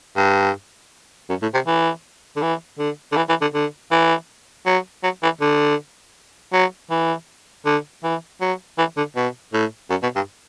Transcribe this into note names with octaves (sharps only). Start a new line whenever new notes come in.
G2
F#2
A2
C3
E3
D3
E3
D3
D3
E3
E3
D3
D3
E3
F#3
F#3
E3
D3
F#3
E3
D3
E3
F#3
E3
D3
B2
A2
F#2
B2
G2